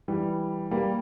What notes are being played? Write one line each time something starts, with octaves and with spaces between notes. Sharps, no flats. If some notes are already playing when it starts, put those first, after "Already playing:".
E3 G3
G3 A#3